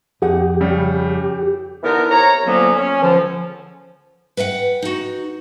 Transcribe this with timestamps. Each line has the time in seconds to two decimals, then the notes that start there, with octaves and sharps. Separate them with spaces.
0.22 F2 G4 G#4 F#5
0.61 C#3 G3
1.83 D3 E3 B3 D#4 A#4
2.09 C2 C#5 A#5
2.45 D3 F3 F#3 A#3 B3 C#4
2.76 C#4
3.01 C#2 D3 F3
4.37 B4 D#5 E5 F#5 G5
4.82 D#4 F#4